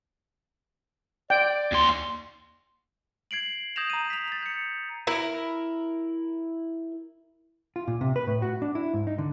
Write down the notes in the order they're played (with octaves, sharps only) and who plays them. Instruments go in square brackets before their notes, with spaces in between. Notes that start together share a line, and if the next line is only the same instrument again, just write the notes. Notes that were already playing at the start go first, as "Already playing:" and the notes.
[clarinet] D5 [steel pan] G5
[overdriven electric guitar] D#2 C6
[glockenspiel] G#6 C7 D7 F#7
D#6 G6 G#6 A#6 E7 F7
A#5 D#7
B6 F7
A6 F7
G6 C#7
[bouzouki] E4 A#4
[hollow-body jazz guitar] F4
A#2
C3
B4
A2
F#4
D4
E4
G#2
D#4
D3